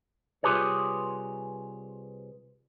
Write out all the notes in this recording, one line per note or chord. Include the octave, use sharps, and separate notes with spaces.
C2 F4 G4 G#4 B4 C#5